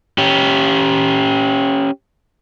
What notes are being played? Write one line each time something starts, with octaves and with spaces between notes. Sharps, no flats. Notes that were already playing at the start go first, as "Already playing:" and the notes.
C#4 G4